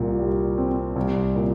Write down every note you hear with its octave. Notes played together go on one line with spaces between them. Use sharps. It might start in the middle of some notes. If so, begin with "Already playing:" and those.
Already playing: C2 A#2
G3
C4
C2
A#2